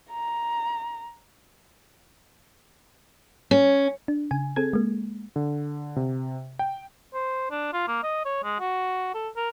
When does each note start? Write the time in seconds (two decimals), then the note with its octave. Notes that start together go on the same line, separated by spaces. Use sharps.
0.11 A#5
3.51 C#4
4.08 D4
4.31 C#3 G#5
4.56 C4 G#4 A4 G#6
4.73 G#3 A#3
5.36 D3
5.96 C3
6.59 G5
7.14 C5
7.51 D4
7.73 F4
7.88 A#3
8.03 D#5
8.25 C#5
8.44 G#3
8.60 F#4
9.14 A4
9.36 A#4